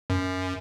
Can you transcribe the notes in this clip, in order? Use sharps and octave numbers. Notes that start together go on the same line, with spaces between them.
F#2